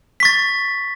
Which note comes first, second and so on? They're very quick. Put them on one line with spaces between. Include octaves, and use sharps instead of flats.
B6 C#6 A6